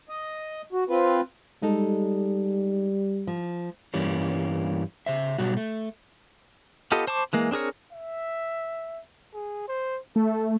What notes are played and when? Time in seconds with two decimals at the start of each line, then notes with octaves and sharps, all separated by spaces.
0.09 D#5
0.73 F#4
0.89 C4 F4 B4
1.62 G3 G#3 D#4 A4
3.27 F3
3.94 G2 E3 G3 A#3 C#4
5.06 C#3 C5 E5
5.38 B2 F#3 G3 F#4
5.57 A3
6.92 B3 F4 G4 A4 D#5
7.07 C5 A5 C#6 D6
7.33 E3 G#3 A#3
7.51 C4 D4 G#4 A#4 C#5
7.93 E5
9.34 G#4
9.68 C5
10.16 A3 A4